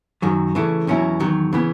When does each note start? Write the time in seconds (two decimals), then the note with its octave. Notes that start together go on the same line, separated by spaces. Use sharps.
0.22 F#2 D#3 F#3
0.55 C#3 E3 A3
0.87 E2 B2 F#3 C#4 E4
1.20 E2 D#3 F#3
1.53 C#3 E3 B3